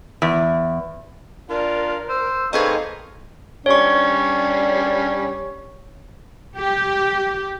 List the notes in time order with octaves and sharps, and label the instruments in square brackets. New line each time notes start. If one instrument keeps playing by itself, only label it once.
[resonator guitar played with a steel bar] E2
[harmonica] D4 F4 [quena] A#4 [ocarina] D5
[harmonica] C5 [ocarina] E6
[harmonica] A#3 C4 D#4 [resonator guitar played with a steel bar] G#4 B4 D#5 [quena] A4 [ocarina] C#6
[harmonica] G3 C#4 D4 [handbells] C#5 C#6
[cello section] G4